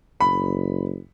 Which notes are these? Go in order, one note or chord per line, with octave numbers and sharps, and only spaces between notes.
F#1 B5